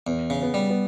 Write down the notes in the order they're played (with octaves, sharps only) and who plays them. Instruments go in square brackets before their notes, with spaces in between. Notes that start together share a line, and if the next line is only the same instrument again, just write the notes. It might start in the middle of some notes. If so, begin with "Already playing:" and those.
[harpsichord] E2
C#3
[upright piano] B3
[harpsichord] G3
[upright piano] B3